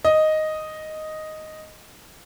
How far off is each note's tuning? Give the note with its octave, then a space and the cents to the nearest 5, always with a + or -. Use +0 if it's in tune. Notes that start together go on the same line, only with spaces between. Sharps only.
D#5 +0